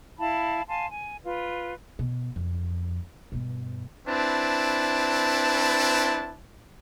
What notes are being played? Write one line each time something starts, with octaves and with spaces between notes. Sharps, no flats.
E4 F5 A5 B5
F5 G#5 A5 C6
G#5
F4 B4
B2
F2
G2 B2
C4 D4 E4 B4 A5